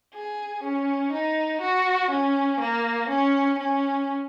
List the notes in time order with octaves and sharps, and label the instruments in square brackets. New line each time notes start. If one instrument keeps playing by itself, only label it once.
[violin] G#4
C#4
D#4
F#4
C#4
A#3
C#4
C#4